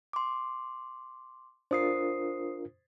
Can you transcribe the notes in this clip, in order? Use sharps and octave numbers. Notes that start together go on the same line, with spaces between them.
C6 D6
D4 F4 A#4 C5 D#6 C7